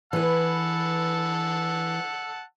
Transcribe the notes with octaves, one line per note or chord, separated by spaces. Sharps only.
E3 B4 F#5 A5 E6